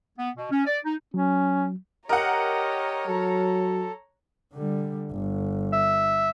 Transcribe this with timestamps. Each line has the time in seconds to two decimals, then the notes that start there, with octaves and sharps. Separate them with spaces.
0.18 B3
0.37 B2
0.51 C#4
0.66 D5
0.85 D#4
1.14 F#3 C#4
2.09 G4 A#4 C#5 D#5 F#5 A#5
3.07 F#3 A4
4.53 D3 G3
5.12 G1
5.73 E5